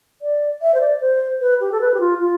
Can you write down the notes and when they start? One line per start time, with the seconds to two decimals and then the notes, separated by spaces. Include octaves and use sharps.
0.22 D5
0.62 E5
0.74 C5
0.81 D5
1.01 C5
1.41 B4
1.60 G4
1.72 A4
1.81 B4
1.94 G4
2.00 F4
2.20 F4